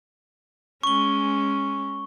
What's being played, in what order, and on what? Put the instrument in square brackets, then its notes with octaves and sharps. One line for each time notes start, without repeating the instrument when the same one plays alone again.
[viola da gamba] G#3 C#4 [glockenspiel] C#6 G7